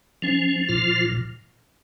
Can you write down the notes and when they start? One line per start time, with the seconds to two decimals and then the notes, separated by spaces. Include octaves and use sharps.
0.22 F3 C#4
0.69 A#2 F4